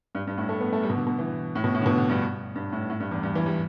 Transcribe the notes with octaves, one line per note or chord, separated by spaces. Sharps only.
G2
G2
A2
A3
B3
A3
G3
B2
D3
B2
E3
A2
B2
A2
D3
B2
D3
G2
G2
A2
A2
G2
E2
G2
E3
G3